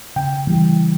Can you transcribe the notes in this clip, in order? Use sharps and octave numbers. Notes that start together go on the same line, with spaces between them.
C#3 G5
E3 G3